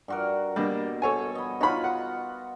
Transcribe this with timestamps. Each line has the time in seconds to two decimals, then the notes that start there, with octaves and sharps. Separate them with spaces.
0.08 G2 F#4 A#4
0.56 B2 G3 A#3 D4
1.02 A4 C#5 G#5
1.35 D#5 B5
1.61 D#4 F4 F#4 C#5 B5
1.84 F#5